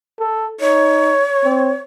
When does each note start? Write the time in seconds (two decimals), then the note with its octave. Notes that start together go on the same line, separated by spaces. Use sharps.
0.19 A4
0.60 D#4 C#5
1.44 C4